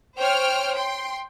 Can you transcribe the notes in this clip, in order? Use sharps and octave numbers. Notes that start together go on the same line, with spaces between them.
C5 C#5 G5 F6
G5 C6